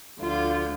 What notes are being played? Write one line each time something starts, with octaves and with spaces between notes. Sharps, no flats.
D2 D3 F3 F4